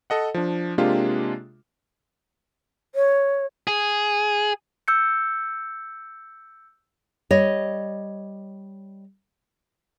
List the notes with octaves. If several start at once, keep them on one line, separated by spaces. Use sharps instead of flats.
A4 D#5 F#5
F3 D4
C3 G#3 A#3 D4 F4 G4
C#5
G#4
E6 G6 C#7
G3 C#5 D#5